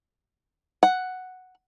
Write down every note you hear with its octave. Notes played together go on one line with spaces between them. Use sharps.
F#5